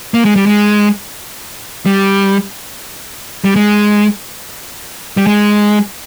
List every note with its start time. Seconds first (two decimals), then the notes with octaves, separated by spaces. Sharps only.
0.14 A#3
0.25 G#3
0.36 G3
0.46 G#3
1.86 G3
3.44 G3
3.56 G#3
5.17 G3
5.27 G#3